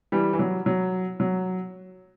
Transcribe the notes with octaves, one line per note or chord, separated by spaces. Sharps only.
E3 G3
E3
F#3
F#3
F#3